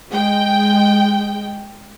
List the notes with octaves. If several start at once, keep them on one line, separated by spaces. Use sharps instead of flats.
G#3 G5